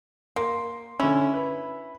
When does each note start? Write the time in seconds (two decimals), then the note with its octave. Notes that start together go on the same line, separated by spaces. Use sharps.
0.36 A#3 C6
1.00 D3 C#4 E4
1.34 B4